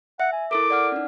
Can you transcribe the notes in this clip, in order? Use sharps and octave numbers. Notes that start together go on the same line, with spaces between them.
E5 F#5
G#5
E4 A4 A#4 D6
D5 F#5 F6
C#4 D#4